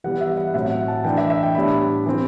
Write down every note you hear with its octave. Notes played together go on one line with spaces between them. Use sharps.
E3 G3 B3 F#5
E5
F#5
A2 F#3 C4 E5
F#5
A5
E3 A3 D4 G5
E5
E5
G5
A2 G3 B3 D4 B5
E3 G3 C4